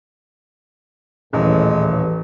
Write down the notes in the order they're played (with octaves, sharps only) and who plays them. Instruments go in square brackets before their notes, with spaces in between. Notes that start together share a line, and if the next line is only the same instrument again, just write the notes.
[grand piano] D#1 [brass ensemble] A1 [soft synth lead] E3 [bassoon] G#3